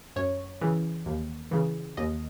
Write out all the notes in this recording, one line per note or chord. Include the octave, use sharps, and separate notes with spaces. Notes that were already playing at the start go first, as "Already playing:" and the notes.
F#2 C#5
C#3 E3
D#2
C#3 E3
D#2 D#5